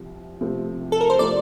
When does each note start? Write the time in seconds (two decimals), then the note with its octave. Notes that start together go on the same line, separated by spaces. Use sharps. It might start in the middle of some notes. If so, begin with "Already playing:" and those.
Already playing: C2 C3 F3
0.41 C3 F3 A3 C4
0.92 A4
1.01 A#4
1.10 C5
1.18 C3 F3 A3 D5